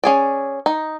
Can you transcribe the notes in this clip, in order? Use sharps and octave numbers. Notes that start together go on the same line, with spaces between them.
C#4 G#4 D5
D#4